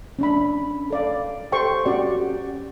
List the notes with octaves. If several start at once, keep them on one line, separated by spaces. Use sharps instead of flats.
C#4 D4 B5
A4 D5 F5
G4 A4 C5 G5 C6 C#6
C#4 F#4 G4 D5